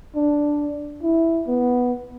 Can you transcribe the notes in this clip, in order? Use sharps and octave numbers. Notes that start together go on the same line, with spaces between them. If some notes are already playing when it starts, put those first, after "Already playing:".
D4
E4
B3